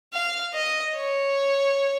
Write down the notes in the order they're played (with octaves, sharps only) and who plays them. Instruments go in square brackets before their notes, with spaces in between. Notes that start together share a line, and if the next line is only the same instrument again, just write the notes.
[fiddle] F5
D#5
C#5